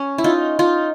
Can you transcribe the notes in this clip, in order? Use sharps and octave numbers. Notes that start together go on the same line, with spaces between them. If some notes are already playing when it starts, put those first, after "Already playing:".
Already playing: C#4
E4
D#4 F4
D#4 F4